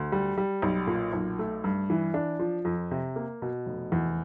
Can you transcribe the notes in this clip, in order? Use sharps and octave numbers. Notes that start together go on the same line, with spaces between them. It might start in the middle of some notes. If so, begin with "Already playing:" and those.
Already playing: D2
G3
G3
B1
A#2
B1
A3
G2
E3
D4
F3
F2
C3
A#3
B2
F1
E2